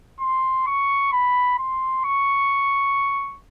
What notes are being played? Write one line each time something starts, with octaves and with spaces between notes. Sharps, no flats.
C6
C#6
B5
C6
C#6